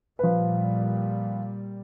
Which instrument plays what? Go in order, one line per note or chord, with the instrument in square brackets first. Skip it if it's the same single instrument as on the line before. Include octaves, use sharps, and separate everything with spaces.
[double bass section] A#2 G3 [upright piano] F3 B4